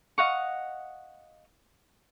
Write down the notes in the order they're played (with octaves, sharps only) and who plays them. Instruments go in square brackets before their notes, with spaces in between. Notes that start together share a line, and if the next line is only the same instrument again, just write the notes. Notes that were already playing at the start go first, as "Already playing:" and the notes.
[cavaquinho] D#5 F5 F#5 C#6